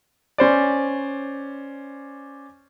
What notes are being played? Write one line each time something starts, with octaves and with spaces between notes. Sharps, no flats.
C#4 C5 D5